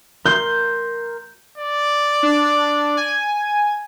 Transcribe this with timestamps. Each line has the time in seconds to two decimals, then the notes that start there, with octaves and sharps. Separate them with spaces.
0.26 A#4 C6 G6
1.58 D5
2.23 D4
2.97 G#5